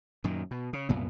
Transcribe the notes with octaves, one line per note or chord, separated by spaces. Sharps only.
F#2 A#2 D#3
B2
C#3
C2 F#2 A#2 B3